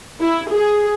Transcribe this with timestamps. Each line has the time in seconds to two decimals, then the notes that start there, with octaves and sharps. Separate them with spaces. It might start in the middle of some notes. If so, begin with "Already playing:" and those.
0.20 E4
0.51 G#4